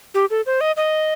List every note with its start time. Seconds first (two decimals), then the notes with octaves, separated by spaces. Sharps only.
0.14 G4
0.30 A4
0.46 C5
0.61 D#5
0.77 D#5